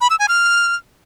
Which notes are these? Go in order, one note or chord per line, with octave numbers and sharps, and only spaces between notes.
B5
E6
G#5
F6